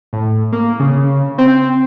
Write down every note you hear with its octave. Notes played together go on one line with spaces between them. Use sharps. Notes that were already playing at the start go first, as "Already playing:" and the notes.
A2
A#3
C#3
C4